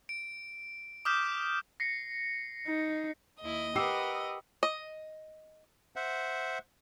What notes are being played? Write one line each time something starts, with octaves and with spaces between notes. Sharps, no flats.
D7
D6 D#6 F6 G6 B6 E7
A#6 C7 C#7
D#4
D#2 E4 D#5
G4 A#4 B4 F#5 D#6 E6 C7
D#5
C5 E5 F#5